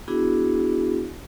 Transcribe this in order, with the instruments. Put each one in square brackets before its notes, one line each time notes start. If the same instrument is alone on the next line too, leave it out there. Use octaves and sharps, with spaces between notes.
[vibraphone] B3 D4 E4 F#4 G#4